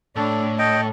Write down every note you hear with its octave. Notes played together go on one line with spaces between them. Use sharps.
A2 D4 A4
A4 D#5 G5